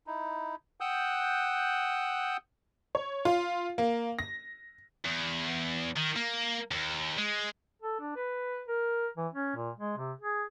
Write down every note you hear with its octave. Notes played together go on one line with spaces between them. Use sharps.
D#4 E4
F#5 G5 D#6 E6 F#6 G6
C#5
F4
A#3
A#6
E2
D#3
A#3
D#2
G#3
A4
D4
B4
A#4
E3
C#4
A#2
G#3
C3
G#4